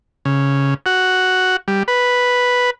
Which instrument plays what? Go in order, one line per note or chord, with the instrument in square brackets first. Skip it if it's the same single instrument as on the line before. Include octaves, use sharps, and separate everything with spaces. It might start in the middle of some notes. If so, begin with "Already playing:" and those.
[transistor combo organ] C#3
F#4
G3
B4